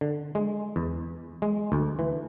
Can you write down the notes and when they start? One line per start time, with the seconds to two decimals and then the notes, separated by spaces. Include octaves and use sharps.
0.01 D3
0.35 G#3
0.76 E2
1.42 G#3
1.72 D2
1.99 E3